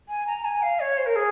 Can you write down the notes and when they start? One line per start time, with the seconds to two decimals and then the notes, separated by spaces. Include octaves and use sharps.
0.09 G#5
0.27 A#5
0.45 G#5
0.62 F5
0.80 C#5
0.98 C5
1.06 A#4
1.16 G#4